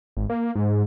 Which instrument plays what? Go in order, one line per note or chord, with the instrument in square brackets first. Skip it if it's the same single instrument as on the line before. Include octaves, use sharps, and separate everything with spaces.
[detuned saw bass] G#1
A#3
G#2